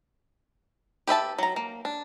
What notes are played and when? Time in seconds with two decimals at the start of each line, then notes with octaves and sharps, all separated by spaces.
1.07 G4 B4 E5 A5
1.39 F#3 A#5
1.56 A#3
1.85 D4